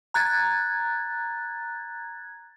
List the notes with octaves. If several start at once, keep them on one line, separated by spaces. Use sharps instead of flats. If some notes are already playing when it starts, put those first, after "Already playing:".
A#5 F#6 G#6 A6